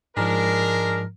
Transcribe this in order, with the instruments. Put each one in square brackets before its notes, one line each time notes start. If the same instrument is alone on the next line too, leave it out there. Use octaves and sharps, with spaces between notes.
[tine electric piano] G#2 F3 [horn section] G#3 D4 A#4